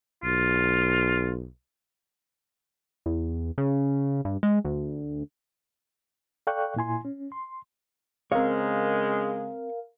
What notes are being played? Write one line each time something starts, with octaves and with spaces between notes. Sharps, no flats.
B1 F4
E2
C#3
G2
G#3
D2
A4 D5 F5 G5 C#6 F#6
A#2 E4 G#5 C6
C#4
C6
C#3 G#3 C4 A#4 C#5 F5